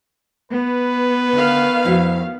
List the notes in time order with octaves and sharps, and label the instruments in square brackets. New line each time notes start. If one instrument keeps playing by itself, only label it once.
[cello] B3 [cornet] B4
[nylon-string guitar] D3 [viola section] D#3 F5
[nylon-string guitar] F2 E4 F#4